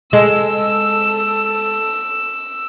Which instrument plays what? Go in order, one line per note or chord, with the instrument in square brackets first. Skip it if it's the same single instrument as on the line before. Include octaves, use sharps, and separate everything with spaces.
[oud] G#3 [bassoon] A4 [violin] E6